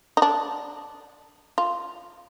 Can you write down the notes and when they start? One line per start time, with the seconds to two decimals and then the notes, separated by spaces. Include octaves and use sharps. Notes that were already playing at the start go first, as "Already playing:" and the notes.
0.17 D#4
0.22 D4
1.58 F4